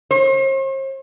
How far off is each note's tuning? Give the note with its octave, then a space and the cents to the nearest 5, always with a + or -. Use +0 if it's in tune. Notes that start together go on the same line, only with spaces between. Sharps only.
C5 +45